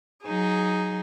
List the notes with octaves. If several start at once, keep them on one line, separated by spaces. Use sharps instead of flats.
F#3 D#4 G#4